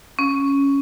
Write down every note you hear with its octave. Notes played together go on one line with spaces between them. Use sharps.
C#4